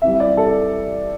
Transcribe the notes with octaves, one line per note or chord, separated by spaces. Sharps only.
C3 E3 G3 E5
D5
A4